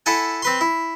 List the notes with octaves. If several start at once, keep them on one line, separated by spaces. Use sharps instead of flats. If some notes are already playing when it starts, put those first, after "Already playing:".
E4 A4 F#5 G#5
C4 B4 C6
E4